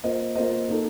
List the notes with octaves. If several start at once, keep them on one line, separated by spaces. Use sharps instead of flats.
A#3 F4 C5 D#5
A#3 F4 C5 D#5
A#3 D#4 A4